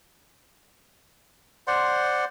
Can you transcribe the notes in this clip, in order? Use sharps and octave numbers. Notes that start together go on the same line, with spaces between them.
C5 D5 F#5 C6